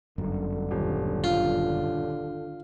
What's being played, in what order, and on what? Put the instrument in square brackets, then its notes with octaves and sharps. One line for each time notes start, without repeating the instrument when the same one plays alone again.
[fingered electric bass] G1 F#2 [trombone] D3
[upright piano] D#1
[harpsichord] F4